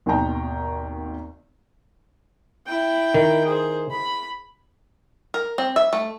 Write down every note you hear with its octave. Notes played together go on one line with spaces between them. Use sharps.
G#1 D#2 B2 D#5 G5 A#5
E4 G5
D#3
G#4 C5
B5
A#4
C4
E5
A3